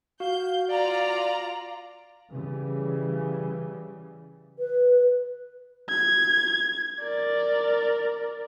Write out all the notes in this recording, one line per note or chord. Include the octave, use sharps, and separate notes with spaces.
F#4 F5 G6
F4 D5 A#5
C#3 E3 G3
B4
G#6
A#4 D5